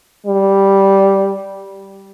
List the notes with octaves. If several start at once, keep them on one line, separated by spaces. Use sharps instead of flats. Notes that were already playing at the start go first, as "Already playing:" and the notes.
G3